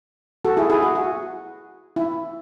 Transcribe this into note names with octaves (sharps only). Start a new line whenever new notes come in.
F#4 A4
E4 G#4
E4 G#4
F#4
F#4
E4